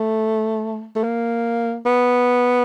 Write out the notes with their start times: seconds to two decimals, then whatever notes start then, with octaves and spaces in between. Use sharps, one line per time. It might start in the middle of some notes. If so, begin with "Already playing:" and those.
Already playing: A3
0.95 A3
1.04 A#3
1.86 B3